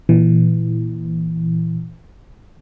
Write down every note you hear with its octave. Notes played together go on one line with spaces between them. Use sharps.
A#2 E3